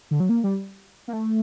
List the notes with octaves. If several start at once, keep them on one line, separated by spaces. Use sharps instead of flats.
D3
F#3
A#3
G3
A#3
A3